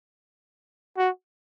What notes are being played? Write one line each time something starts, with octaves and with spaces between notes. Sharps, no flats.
F#4